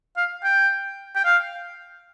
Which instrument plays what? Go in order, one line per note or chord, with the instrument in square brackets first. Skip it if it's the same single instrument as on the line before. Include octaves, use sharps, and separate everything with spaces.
[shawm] F5
G5
G5
F5